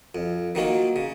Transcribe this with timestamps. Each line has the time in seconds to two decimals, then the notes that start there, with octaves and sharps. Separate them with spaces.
0.15 F2
0.55 D#3 F#3 A#3 F4
0.96 C#3